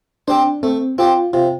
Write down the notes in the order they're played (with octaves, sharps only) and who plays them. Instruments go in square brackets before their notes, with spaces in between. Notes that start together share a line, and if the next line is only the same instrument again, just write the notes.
[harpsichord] C4 G4 C5 [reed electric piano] D4
[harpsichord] A3 [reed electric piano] C4
[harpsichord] C4 G4 C5 [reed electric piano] F4
[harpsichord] C3 [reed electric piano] F4